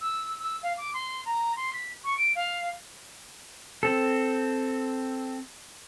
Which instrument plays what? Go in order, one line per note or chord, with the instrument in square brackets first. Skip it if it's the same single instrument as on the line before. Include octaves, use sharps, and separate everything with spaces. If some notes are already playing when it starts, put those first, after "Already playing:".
[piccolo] E6
E6
F5
D6
C6
A#5
C6
B6
C#6
D7
F5
[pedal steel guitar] C4 A4